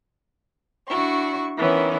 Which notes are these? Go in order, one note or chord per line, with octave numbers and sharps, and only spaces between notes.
D4 E4 F#4 C#6
D#3 E3 B3 C#4